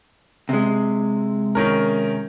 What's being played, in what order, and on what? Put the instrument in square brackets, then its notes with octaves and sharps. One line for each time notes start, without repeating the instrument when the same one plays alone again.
[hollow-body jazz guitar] C3 G#3
[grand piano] D#3 C#4 A#4